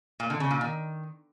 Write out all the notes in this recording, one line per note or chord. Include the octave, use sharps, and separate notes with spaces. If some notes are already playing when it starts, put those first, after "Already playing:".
A#2
D3
C#3
A#2
D#3